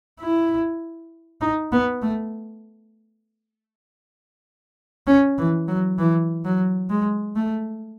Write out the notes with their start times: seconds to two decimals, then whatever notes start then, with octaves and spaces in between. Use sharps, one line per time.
0.20 E4
1.41 D#4
1.72 B3
2.02 A3
5.07 C#4
5.38 E3
5.68 F#3
5.99 E3
6.45 F#3
6.90 G#3
7.36 A3